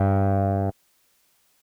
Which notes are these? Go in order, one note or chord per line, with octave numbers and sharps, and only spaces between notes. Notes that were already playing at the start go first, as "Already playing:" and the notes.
Already playing: G2